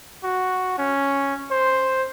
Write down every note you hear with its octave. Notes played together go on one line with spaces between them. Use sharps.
F#4
C#4
C5